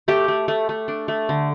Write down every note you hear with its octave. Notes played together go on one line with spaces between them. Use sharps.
A3 G4
A3
A3
A3
D4
A3
D3